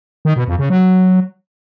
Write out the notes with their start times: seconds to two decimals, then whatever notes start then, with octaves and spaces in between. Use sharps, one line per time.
0.25 D#3
0.36 B2
0.47 F2
0.59 C#3
0.70 F#3